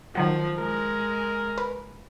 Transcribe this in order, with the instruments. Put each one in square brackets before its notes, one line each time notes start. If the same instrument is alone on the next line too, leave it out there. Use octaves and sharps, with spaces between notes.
[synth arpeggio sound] D#3 F#3 F#4 [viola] F3
[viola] G#3 [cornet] A#4
[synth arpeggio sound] B4